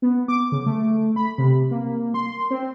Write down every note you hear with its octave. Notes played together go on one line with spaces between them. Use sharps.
B3
D6
C#3
A3
B5
C3
A#3
C6
C4